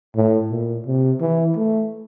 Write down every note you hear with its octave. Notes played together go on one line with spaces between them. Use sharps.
A2
A#2
C3
E3
A3